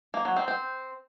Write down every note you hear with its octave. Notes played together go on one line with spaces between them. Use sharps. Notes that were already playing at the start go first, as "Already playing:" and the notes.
A#3
F#3
C4
C4